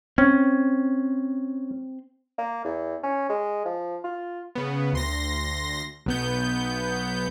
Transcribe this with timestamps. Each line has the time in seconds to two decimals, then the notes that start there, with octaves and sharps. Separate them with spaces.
0.18 C4 C#4
2.38 A#3
2.65 E2
3.03 C#4
3.29 G#3
3.65 F3
4.04 F4
4.55 C#3 B3
4.93 D2 C6 A#6
6.06 B1 B3 G6